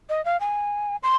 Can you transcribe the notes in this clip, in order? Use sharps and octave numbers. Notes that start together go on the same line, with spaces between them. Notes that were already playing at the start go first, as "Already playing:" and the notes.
D#5
F5
G#5
C6